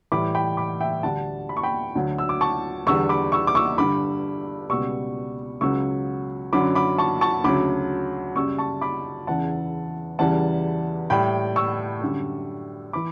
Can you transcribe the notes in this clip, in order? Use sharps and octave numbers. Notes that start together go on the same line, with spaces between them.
A2 E3 G3 B5 D6
G5 B5
B5 D6
E5 G5
D2 D3 G3 F#5 A5
B5
C#6
G5 B5
D2 D3 F#3
E6
D6
A5 C#6
E2 D3 G3 C#6 E6
B5 D6
C#6 E6
D6
C#6 E6
G2 D3 G3 B5 D6
C#2 B2 G3 C#6 E6
C#2 C#3 F#3 C#6 E6
F#2 D3 F#3 B5 D6
B5 D6
A5 C#6
A5 C#6
D2 C#3 F#3 B5 D6
F#2 C#3 G3 C#6 E6
A5 C#6
B5 D6
E2 C#3 E3 F#5 A5
E2 C#3 E3 G3 F#5 A5
A2 G3 G5 B5
C#6 E6
F#2 D3 G3
E3 B5 D6